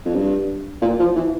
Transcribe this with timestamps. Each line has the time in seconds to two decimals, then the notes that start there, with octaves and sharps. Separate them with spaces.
0.05 F2
0.14 G2
0.82 A#2
0.99 F3
1.16 E3